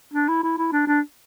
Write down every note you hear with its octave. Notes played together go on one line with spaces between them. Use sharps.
D4
E4
E4
E4
D4
D4